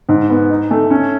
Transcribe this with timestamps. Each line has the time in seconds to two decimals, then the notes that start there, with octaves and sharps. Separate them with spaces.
0.09 G#2
0.30 B3
0.50 D#4
0.71 A3
0.90 C#4